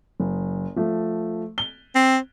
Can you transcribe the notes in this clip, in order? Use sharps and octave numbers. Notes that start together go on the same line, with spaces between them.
F#1
F3 A3
G7
C4